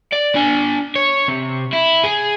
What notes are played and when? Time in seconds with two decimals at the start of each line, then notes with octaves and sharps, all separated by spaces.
0.13 D5
0.36 D4 G#5
0.96 C#5
1.28 C3
1.73 E4
2.04 G#4